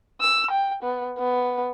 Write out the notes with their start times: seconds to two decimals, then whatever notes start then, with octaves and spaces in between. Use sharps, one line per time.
0.21 E6
0.51 G5
0.83 B3
1.18 B3